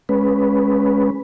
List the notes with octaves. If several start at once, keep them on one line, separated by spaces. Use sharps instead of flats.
G#3 C#4 B4